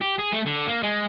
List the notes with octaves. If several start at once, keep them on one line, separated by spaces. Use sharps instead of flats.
G4
G#4
A3
D3
A#3
G#3